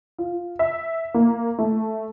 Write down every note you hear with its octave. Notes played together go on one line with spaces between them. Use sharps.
F4
E5
A#3
A3